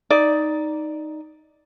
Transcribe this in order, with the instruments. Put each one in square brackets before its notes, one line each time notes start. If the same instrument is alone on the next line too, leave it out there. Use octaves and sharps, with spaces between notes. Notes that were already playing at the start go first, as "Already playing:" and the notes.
[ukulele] D#4 D5